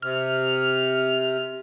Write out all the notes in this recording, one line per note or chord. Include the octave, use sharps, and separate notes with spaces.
C3 F6